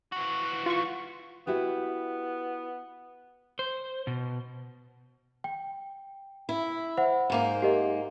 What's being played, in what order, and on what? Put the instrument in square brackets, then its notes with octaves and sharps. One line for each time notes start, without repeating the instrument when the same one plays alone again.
[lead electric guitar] E3 F#4
[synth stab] F4 C#6
[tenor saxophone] B3 [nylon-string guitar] E4 F#4 G4
[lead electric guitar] C5
B2
[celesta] G5
[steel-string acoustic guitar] E4
[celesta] C5 E5 F#5
[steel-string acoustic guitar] G#2 A#3 D#4
[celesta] G4 A#4 D#5